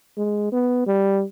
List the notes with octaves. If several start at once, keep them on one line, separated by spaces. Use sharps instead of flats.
G#3
B3
G3